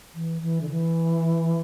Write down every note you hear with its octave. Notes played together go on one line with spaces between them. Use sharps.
E3
E3
D3
E3